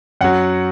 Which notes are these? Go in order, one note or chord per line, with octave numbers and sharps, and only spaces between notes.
F#2 F#3 F#5